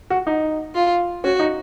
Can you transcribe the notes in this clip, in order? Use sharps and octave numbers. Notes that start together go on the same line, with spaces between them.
F#4
D#4
F4
C#4 F#4
D#4